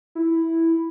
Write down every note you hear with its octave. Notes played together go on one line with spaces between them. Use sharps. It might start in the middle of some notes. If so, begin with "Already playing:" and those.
E4